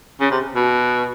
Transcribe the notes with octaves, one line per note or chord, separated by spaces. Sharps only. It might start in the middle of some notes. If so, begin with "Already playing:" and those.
C#3
C3
B2